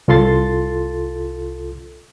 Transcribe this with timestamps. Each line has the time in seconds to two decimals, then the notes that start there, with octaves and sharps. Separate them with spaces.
0.08 C2 F4 A4 C6 A6